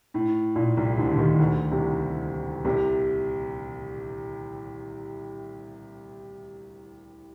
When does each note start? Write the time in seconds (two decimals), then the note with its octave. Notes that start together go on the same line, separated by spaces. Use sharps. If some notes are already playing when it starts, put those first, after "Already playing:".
0.14 A2
0.56 A#2
0.77 C2 C3
0.98 D2 D3
1.11 D3
1.19 D#2 D#3
1.39 D2 D3
1.72 C2 C3
2.65 C2 C3